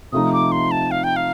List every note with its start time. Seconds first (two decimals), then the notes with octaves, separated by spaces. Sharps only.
0.12 C3 F3 A3 D#4 D#6
0.33 D6
0.52 C6
0.71 A5
0.91 F5
1.04 G5
1.16 F5